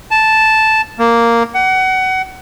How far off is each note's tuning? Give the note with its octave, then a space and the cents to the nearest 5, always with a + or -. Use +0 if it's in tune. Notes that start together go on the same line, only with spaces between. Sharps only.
A5 -5
A#3 -5
F#5 +25